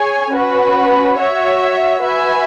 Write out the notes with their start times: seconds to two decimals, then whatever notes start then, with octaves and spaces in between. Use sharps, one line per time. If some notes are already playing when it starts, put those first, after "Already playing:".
Already playing: G#4 C#5 G#5
0.31 C#4 F#4 B4
1.17 F#4 C#5 E5
2.02 F#4 B4 E5 G#5